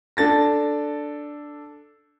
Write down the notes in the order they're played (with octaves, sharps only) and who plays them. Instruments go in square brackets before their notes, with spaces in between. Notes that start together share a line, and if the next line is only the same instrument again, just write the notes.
[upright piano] D4 A4 A6 A#6